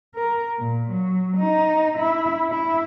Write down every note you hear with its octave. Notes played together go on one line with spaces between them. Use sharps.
A#4
A#2
F#3
D#4
E4
E4